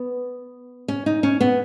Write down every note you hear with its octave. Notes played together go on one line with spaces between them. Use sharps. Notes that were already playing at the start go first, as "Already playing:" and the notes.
Already playing: B3
C#4
D#4
C#4
B3